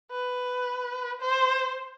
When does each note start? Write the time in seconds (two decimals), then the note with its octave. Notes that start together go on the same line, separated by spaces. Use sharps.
0.11 B4
1.21 C5